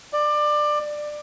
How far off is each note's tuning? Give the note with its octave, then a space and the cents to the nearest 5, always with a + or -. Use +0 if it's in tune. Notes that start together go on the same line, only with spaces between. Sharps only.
D5 +20